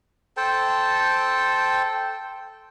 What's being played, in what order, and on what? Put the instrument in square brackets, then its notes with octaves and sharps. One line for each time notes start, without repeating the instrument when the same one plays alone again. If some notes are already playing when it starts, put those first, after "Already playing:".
[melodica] A4 C5 G5 A5